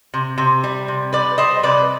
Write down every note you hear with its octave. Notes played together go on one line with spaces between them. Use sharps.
C3
C3
G3
C3
C3 B4 D5
G3 C5 D#5
C3 B4 D5